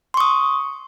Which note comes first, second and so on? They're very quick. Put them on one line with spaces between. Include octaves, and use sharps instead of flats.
C6 C#6 D#6